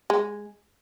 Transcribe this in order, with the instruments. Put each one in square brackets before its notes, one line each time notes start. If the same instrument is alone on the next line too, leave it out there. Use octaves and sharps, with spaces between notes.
[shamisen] G#3